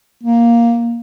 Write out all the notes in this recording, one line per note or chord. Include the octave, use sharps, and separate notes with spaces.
A#3